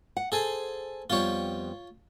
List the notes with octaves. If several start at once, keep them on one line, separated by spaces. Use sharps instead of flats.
F#5
G#4 A4 C5 G#5
F2 G3 B3 F4 C#5